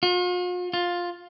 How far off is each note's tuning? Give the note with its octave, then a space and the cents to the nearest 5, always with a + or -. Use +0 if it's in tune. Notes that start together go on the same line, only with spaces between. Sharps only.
F4 +45
F4 +10